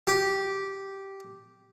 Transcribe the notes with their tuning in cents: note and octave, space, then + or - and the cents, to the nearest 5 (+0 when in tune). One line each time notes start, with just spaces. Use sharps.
G4 -10